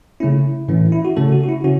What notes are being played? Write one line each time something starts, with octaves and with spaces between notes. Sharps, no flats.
C#3 A3 C#4 E4
A2 E3 A3 C#4
E4
F#4
C#3 A3 C#4 A4
F#4
F#4
E4
C#3 C#4 F#4